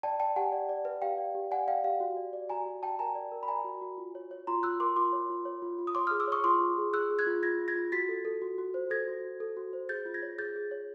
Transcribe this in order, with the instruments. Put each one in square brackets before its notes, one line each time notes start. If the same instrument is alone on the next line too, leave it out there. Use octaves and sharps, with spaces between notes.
[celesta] D5 G5 A5
D5 G5 A5
G4 F#5 G#5
D5
D5
B4
G4 F5 G5
D5
G4
D5 F#5 G#5
D5 F5 G5
G4 F5
F#4
D5
D5
F#4 G#5 A#5
F#4
D5 G5 A5
A#4 G#5 A#5
D5
A#4
B5
D5 G#5 A#5
F#4
F#4
F4
C#5
C#5
F4 A#5 C6
F4 E6 F#6
A#4 C6 D6
F4 C6 D6
C#5
F4
C#5
F4
F4
D#6
C#5 C6 D6
D#6 F6
G#4
D6 E6
C#5 C#6 D#6
F4 C6 D6
F4
G#4
G#4 E6 F#6
G#4
F#6 G#6
F4
F4 G#6 A#6
F4
G#6 A#6
F4
F#4 A6 B6
A4
A4
F#4
F#4
C5
A4 G#6 A#6
F#4
F#4
A4
F#4
C5
G#4 G6 A6
F4
G#6 A#6
C#5
G#4 G6 A6
G#4
C#5